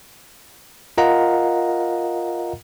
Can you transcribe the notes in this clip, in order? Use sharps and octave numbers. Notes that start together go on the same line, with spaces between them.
F4 A#4 D#5 F5 F#5 A#5